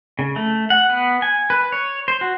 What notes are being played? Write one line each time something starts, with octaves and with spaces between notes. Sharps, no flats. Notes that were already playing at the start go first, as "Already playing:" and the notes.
C#3
A3
F#5
B3
G#5
B4
C#5
C5
F#4